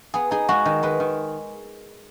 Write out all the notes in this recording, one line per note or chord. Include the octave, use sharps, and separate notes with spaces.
B3 G#4
D#4 G#4
G#3 F#4
D#3
G#3 B4
D#3